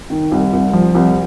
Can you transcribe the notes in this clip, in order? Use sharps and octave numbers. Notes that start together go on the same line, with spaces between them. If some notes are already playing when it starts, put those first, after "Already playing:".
D#3
C2
C2
F3
C2